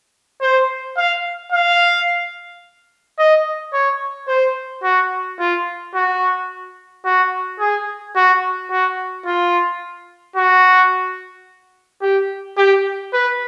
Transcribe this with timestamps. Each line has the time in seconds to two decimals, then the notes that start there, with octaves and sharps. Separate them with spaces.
0.42 C5
0.97 F5
1.52 F5
3.19 D#5
3.74 C#5
4.28 C5
4.83 F#4
5.40 F4
5.95 F#4
7.05 F#4
7.60 G#4
8.16 F#4
8.71 F#4
9.26 F4
10.36 F#4
12.02 G4
12.57 G4
13.13 B4